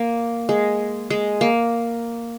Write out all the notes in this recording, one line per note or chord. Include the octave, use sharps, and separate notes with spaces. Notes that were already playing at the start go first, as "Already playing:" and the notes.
Already playing: A#3
G#3
G#3
A#3